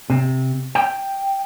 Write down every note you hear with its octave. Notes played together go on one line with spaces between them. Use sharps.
C3
G5